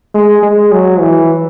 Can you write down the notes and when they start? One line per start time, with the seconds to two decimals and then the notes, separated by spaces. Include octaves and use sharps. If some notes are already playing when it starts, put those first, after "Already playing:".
0.14 G#3
0.43 G#3
0.72 F#3
1.01 E3